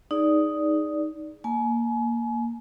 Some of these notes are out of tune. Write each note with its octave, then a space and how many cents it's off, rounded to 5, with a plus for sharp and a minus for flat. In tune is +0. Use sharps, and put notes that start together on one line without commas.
D#4 +0 G#4 +0 D5 -5
A#3 +0 G#5 +35